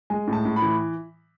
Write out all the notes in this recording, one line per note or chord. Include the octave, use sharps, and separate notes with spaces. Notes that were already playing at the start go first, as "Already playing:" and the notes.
G#3 G#5
A2
A5
A2
B5
E3